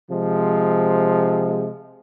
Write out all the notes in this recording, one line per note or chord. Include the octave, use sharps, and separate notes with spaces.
C3 F3 G#3